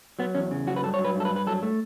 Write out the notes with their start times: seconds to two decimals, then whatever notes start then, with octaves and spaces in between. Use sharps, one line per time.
0.19 F#3 B3
0.35 E2 C#4
0.51 C#3
0.67 F#3 F#4
0.76 B4
0.83 G2 A4
0.94 C#5
0.99 F#3
1.04 B4
1.15 G2
1.20 A4
1.25 B4
1.31 G2
1.36 B4
1.47 F#3 A4
1.63 A3